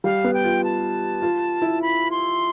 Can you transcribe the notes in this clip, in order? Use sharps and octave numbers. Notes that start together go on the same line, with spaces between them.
G3 F5
B3
G5
F4
A5
F4
E4
B5
C6